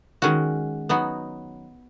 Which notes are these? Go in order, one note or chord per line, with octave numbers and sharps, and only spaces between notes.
D#3 G#3 C#4 F#4
F#3 B3 D#4 F#4